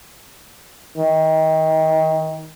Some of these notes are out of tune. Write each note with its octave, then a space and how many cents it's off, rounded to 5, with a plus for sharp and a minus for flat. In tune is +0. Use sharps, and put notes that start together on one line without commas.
D#3 +30